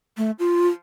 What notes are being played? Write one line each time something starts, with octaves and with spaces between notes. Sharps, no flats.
A3
F4